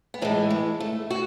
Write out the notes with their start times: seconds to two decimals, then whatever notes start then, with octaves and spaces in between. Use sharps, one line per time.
0.14 B3
0.22 A2 E3 G#3 A3
0.50 G#3
0.80 A3
1.10 F#4